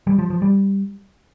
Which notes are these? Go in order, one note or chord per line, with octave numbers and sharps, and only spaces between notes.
G3
F3
F3
G3